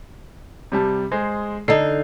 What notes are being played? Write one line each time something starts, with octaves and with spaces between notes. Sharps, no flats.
C3 G3 A5
G#3 G#4 C5
D3 D#4 C7